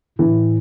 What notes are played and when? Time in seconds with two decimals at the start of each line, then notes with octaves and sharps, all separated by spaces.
0.19 A2 E3